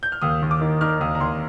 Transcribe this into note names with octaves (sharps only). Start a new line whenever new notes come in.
G6
F6
D#2 D#6
D#2
D6
D#3
D#3 F6
D#2 D#6
A#5
D#2 C6